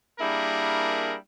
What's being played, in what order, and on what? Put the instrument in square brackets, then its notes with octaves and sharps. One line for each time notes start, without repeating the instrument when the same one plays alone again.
[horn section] G3 A#3 D4 E4 G#4 A#4